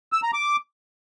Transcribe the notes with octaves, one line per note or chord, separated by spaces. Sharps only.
E6
A#5
D6